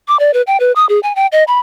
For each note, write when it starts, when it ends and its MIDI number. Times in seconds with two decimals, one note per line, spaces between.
0.08 0.17 86
0.20 0.33 74
0.34 0.42 71
0.47 0.57 79
0.60 0.72 71
0.76 0.86 87
0.89 1.00 68
1.03 1.15 80
1.16 1.27 79
1.32 1.44 75
1.47 1.59 83